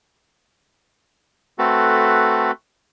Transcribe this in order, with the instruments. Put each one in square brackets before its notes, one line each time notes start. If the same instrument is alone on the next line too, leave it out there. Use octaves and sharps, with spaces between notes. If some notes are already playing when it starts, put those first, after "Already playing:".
[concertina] A3 C4 F#4 A4 B4